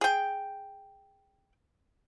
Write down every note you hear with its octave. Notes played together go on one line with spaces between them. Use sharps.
G#4 G5